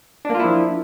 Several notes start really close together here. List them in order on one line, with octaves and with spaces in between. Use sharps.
D4 A#3 F4 E4 F3